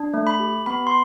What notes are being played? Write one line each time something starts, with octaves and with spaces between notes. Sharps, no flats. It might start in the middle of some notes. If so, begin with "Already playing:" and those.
Already playing: D4
A3
B5
G4
B3 B5
C6